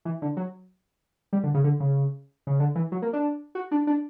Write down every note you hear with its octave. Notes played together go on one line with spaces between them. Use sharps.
E3
D3
F#3
G3
D3
C#3
D3
C#3
C#3
D3
E3
F#3
A#3
D4
F#4
D4
D4